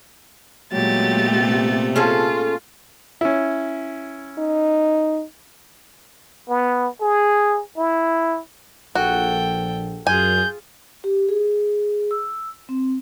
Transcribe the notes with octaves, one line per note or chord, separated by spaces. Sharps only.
A#2 F#3 G#3 A3 B3 G4 A6
C3
C#4 F4 G#4 A4
C#4 E4
D#4
B3
G#4
E4
A#1 F#4 A4 G5
F#2 F4 G#4 G#5 G6
G4
G#4
E6
C4